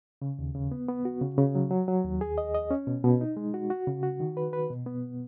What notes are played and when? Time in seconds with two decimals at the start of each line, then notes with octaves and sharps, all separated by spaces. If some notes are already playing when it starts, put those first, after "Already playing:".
0.22 C#3
0.39 D#2
0.55 C#3
0.71 B3
0.89 B3
1.05 F#4
1.21 C#3
1.38 C#3
1.55 F#3
1.71 F#3
1.88 F#3
2.04 D#2
2.21 G#4
2.38 D#5
2.54 D#5
2.71 C#4
2.87 B2
3.04 B2
3.21 D#4
3.37 G#3
3.54 F#4
3.70 F#4
3.87 C#3
4.03 F#4
4.20 D#3
4.37 B4
4.53 B4
4.70 B2
4.86 B3